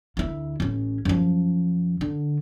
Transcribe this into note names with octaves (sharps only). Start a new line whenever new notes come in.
D2 E4
A1 C#4
F#2 F3
D3